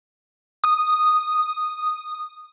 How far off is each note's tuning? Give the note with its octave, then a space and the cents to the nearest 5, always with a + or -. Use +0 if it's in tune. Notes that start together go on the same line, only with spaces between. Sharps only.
D#6 -10